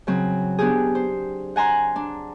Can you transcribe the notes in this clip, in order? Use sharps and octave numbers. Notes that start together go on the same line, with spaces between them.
C#3 F#3 C4
B3 D4 G4 G#4
C5
F#5 G#5 A#5 C6 F#6
D4